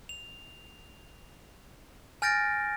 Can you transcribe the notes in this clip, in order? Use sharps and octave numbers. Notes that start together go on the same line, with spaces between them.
F7
G#5 F6 G6 A6 A#6 D7